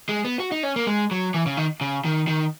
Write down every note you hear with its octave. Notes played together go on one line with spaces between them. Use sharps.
G#3
B3
F#4
D#4
C#4
A#3
G#3
F#3
E3
C#3
D#3
C#3
D#3
D#3